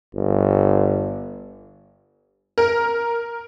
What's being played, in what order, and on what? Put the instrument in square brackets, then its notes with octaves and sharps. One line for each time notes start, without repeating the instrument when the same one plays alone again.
[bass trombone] G1
[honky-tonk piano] A#4